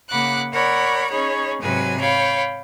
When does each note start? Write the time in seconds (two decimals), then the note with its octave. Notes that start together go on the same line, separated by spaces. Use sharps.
0.10 C#3 A#3 F#5 B5 D6 F#6
0.52 A#4 C#5 D5 F#5 B5
1.10 C#4 D#4 G#4 C#5 B5
1.61 G#2 C3 F#3 B4 G#5
2.00 C#5 F5 G5 B5